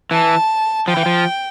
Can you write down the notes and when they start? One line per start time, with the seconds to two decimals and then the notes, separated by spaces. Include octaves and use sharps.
0.11 E3 A5
0.88 F3 G5
0.97 E3
1.06 F3